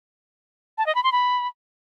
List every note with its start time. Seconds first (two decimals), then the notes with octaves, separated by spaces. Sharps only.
0.78 A5
0.87 D#5
0.95 B5
1.04 C6
1.12 B5